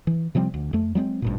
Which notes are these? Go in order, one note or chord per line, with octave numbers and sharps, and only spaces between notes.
E3
C3 F3 G3 C4
D2
F2 A3
F#3 G#3 B3 C4
A1 G2 A#2